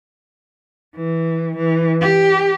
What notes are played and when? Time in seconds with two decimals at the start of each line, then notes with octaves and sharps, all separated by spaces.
0.96 E3
1.57 E3
2.01 G4